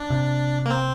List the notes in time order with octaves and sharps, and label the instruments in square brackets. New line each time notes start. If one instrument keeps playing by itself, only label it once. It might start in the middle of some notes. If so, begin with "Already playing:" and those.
Already playing: [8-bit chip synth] D4
[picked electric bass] C3
[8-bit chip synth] A#3
C4